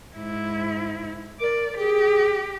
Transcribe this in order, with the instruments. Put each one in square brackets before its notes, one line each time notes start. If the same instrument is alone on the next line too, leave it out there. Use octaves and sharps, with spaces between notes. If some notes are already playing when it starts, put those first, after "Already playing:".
[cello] G#2 E4
[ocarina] A#4 [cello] D5
[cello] G4 [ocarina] G#4